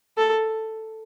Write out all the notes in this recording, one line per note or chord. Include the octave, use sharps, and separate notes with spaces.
A4